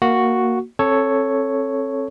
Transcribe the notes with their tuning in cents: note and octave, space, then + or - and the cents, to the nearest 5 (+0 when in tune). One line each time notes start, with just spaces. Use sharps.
A#3 +0 F#4 +0
C4 +35 A4 +0 C#5 +0